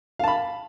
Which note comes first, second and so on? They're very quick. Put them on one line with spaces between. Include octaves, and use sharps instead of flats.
F5 A5 B5